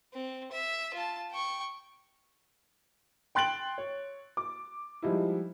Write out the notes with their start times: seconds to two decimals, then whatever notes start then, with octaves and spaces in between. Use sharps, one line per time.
0.13 C4
0.51 E5
0.93 F4 A5
1.31 G5 C#6
3.35 G5 C6 F#6 A6 D7 F#7
3.78 C#5
4.37 D6
5.02 F3 G3 G#3 D#4 E4